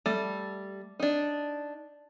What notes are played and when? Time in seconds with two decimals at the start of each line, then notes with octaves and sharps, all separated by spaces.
0.06 G3 A3
1.00 D4 D#4